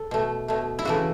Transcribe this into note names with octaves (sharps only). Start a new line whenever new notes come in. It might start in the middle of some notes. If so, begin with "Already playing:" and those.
Already playing: A4
B2 A3
B2 A3
E4
C#3 E3 A3 F#4